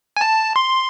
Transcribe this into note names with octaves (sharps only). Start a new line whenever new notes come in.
G#5
A5
C6